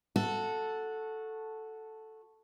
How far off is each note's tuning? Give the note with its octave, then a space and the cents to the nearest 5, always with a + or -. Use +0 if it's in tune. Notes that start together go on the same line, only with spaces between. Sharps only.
F#4 -10 A4 +0